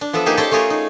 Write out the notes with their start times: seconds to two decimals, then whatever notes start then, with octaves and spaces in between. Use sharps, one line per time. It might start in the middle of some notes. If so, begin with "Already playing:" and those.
0.01 D4
0.13 F3 B3 A4 E5
0.26 A#3 D#4 G4 G#4
0.37 C#4 A4 C5 D5 G5 A5
0.51 A3 C#4 F4 G#4 A#4
0.70 D#4